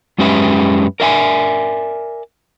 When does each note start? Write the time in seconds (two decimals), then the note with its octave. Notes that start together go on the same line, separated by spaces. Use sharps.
0.18 F#2 G#3 C#4 G4 B4 E5
1.00 A#4 D5 E5 G5 G#5